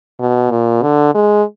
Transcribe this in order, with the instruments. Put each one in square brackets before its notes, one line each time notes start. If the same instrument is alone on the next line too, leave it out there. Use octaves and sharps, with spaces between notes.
[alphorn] B2
A#2
D3
G#3